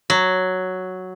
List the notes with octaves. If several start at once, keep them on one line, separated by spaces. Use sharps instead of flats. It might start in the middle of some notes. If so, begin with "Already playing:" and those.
F#3